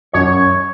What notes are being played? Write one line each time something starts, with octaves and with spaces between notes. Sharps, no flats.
F#2 C#5